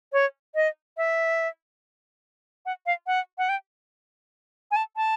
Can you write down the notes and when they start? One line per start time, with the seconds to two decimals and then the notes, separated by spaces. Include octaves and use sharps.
0.13 C#5
0.55 D#5
0.97 E5
2.66 F#5
2.86 F5
3.07 F#5
3.38 F#5
3.49 G5
4.71 G#5
4.76 A5
4.96 A5